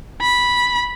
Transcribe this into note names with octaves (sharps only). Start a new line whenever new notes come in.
B5